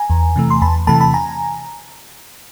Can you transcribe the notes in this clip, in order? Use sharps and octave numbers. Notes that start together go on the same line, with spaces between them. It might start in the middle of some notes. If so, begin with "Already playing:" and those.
Already playing: G#5 A#5
E2
C3 E3 A3
C6
E2 A5 B5
C3 E3 A3 A5 B5
A5 B5
G#5 A#5